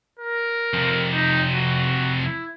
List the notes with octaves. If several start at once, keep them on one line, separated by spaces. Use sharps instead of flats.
A#4
F2 C3
D#4
F#4
E4